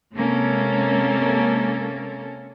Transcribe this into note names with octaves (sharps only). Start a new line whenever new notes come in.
C3 G#3 A#3 C#4 A4